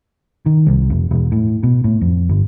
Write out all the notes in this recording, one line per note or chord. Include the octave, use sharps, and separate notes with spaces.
D#3
C2
F1
E1
A2
B2
A2
F2
G1